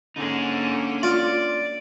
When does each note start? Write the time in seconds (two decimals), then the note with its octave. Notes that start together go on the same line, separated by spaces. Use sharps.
0.16 D3 A#3 C#4 D#4 G#4
1.03 F4 D5